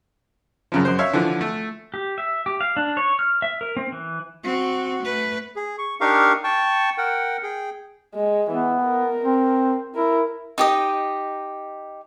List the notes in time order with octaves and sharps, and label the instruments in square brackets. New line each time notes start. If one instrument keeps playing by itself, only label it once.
[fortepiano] F#2 C#3 F3
F#2 C5
C#5 E5 F5
D3 E3 F3
A3
[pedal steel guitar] G4
E5
G4
F5
D4
C#5
F6
E5
A#4
C4
E3
[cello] C4 F#4
A3 B4
[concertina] G#4
C#6
D4 D#4 G4 A#4 F5 C#6
G5 A5 C#6
A#4 F#5 G5
G#4 G5
[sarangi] G#3
[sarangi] E3 [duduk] B3
[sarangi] A#4
[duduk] C4
[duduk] E4 [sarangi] A#4
[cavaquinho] D#4 G4 D#5